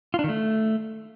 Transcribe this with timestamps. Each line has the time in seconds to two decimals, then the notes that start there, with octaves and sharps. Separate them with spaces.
0.14 F4
0.19 D4
0.24 D#3
0.29 A3